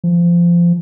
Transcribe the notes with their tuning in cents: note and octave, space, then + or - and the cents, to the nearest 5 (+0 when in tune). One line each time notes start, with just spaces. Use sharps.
F3 -20